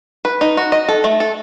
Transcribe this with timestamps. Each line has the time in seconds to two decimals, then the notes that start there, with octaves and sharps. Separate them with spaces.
0.25 B4
0.41 D#4
0.57 F#4
0.72 D#5
0.89 A4
1.04 A3
1.20 A4